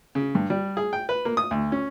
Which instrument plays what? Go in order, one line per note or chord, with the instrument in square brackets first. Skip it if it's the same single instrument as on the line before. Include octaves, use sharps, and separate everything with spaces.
[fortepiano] C#3
G2
G3
G#4
G5
B4
A#3
D#6
D2
C#4